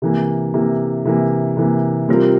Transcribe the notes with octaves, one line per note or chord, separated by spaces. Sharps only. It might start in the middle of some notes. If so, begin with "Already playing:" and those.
C3 E3 A#3
C3 E3 A#3
C3 E3 A#3
C3 E3 A#3
C3 G3 C4 F4 A#4